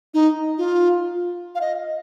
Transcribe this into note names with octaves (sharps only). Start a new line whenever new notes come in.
D#4
F4
F5
D#5